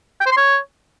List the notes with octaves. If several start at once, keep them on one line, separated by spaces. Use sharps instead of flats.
G5
C5
C6
C#5